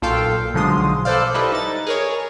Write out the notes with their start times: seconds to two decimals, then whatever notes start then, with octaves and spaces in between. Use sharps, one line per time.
0.02 B1 A#2 F4 A4 F5 G5
0.54 B1 D3 F3 G#3 C6 D#6
1.05 A4 B4 C5 D5 F5
1.34 G3 E4 A4 B4 D5 D#5
1.52 D#4 A6
1.87 G#4 A#4 C#5